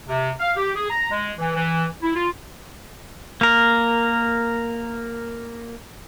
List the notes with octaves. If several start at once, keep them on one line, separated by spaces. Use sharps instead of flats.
C3
F5
G4
G#4
A#5
G#3
E3
E3
E4
F4
A#3 A#4